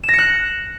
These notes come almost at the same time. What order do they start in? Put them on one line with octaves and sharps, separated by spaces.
E7 A#6 C#7 F#6